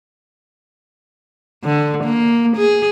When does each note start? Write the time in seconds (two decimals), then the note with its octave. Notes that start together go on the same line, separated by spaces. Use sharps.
1.64 D3
2.04 A#3
2.57 G#4